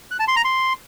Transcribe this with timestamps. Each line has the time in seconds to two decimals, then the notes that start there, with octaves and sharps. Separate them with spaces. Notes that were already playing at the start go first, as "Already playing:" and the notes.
0.11 F#6
0.20 A5
0.28 C6
0.36 A#5
0.45 C6